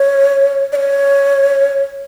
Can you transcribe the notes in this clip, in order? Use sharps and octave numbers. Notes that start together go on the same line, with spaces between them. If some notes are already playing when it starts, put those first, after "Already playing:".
Already playing: C#5
D5
C#5